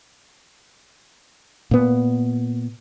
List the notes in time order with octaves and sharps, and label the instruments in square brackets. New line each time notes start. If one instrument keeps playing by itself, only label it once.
[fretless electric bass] A#2 B3